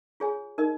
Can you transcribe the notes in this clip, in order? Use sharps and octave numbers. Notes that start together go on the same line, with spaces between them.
F4 G#4 C#5 G#5
D#4 A#4 D#5